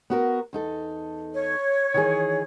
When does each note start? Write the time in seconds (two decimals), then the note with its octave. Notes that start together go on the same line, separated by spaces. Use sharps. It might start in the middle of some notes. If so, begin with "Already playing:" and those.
0.10 B3 F#4 A#4
0.53 E2 D#4 A4
1.34 C#5
1.94 D#3 E3 G#4